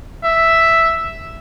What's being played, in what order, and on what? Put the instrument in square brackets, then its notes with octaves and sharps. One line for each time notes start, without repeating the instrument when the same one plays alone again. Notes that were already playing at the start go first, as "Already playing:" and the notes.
[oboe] E5